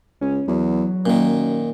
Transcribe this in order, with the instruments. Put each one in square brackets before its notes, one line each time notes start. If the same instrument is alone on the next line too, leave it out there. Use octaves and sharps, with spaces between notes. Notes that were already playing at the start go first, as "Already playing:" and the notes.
[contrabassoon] C#2 [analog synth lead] C#4
[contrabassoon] E2 [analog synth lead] F#3
[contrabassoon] F#2 [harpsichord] A#2 D#3